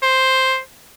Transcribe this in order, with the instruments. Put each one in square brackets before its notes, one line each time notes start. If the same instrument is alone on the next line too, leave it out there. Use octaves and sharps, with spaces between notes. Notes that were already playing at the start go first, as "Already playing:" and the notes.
[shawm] C5